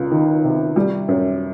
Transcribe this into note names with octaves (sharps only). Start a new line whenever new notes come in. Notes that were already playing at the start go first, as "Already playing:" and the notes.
Already playing: C#2
D#3
C3
G3
F#2